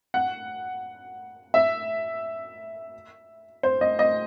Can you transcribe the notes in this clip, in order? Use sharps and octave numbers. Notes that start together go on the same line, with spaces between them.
F#5
E5
C5
D#5
D#5